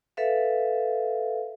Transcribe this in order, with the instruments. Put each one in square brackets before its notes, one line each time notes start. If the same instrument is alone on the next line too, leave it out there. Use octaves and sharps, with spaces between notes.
[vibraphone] A4 B4 E5 F5